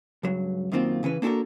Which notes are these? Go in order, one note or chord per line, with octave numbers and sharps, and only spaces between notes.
C#2 G2 F#3
F#2 D#3 A#3 C4 F4
C#3 E3 C#4 B4
A#3 D4 F#4 G4 A4 A#4